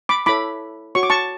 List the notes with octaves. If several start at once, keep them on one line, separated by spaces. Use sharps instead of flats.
B5 D6
E4 A4 C#5 B5 D6
F#4 C#5 C#6
D6
A5 C#6